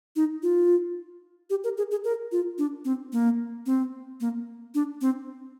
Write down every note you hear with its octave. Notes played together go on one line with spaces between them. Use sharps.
D#4
F4
G4
A#4
G#4
G#4
A#4
F4
D4
C4
A#3
C4
A#3
D4
C4